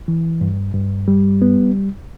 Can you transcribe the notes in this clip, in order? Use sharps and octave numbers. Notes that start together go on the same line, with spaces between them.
E3
G2
G2
G3
B3